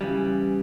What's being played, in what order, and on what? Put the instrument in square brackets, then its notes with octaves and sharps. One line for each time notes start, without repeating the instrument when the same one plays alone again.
[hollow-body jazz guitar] C#3 E3 G3